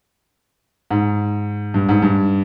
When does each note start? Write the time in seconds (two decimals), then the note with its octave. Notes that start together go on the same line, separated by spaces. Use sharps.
0.91 G#2
1.74 G2
1.89 G#2
2.02 G2